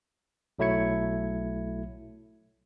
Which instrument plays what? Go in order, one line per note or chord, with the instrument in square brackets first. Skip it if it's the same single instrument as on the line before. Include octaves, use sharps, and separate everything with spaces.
[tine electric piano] B1 F#3 A3 E4 G#6 C#7